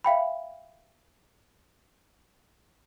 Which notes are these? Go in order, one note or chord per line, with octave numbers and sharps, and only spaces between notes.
E5 F5 G5 B5